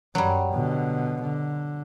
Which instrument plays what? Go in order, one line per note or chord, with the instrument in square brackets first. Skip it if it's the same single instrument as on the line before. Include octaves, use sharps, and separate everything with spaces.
[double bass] F#2 [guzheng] F#3 G3
[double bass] B2 D3
D3